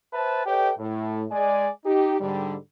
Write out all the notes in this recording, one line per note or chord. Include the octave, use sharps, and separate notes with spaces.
B4 C5 E5 A5
G4 A4 B4 C#5 D#5 G5
A2
G#3 D5 G#5
D#4 G4
G#2 D3 G3